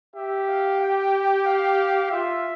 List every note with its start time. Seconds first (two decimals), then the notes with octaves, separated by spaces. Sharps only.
0.15 G4 E5
0.48 F5
0.80 G5
1.46 F5
2.11 F4 E5